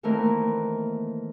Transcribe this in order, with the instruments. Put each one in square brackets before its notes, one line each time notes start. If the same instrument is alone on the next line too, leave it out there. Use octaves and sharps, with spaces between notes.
[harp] D#3 E3 A3 A#3 C4 A#4